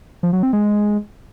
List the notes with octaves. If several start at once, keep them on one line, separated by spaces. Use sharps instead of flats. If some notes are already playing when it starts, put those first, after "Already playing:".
F3
F#3
C4
G#3